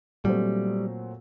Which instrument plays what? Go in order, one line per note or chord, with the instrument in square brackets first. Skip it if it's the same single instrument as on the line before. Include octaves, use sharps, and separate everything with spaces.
[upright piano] A#2 F#3 A3 C4 [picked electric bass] G3